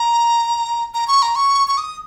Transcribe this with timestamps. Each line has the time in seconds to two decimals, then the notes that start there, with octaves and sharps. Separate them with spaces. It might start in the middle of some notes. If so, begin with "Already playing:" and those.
Already playing: A#5
0.94 A#5
1.08 C#6
1.22 A#5
1.36 C#6
1.68 C#6
1.78 D#6